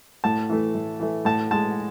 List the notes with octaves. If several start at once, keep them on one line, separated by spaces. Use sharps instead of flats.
A2 A5
E3 A3
A2
E3 A3
A2 A5
G#3 A5